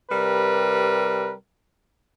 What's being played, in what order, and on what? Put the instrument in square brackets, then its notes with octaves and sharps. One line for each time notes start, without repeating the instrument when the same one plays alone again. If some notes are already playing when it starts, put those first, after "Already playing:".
[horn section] C3 G3 A#4 B4